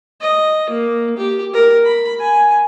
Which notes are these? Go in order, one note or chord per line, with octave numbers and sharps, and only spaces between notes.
D#5
A#3
G4
A#4
B5
G#5